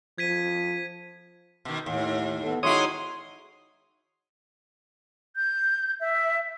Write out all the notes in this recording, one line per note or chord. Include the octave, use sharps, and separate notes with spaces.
F3 G#6 B6 D#7
B2 D#3
D#2 A2
B3 A4
D#3 G#3 D#4 E4 F#4 C#5 C6 D#6
G6
E5